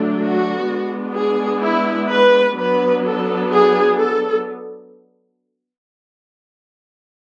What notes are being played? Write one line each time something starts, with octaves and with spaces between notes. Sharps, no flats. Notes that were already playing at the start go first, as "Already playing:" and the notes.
Already playing: D3 F#3 A3 D4
F#4
G#3 B3 D4
G#4
E4
B4
F#3 B3 D4 B4
A4
G#4
A4